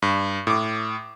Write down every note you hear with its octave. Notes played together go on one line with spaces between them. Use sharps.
G2
A2 D6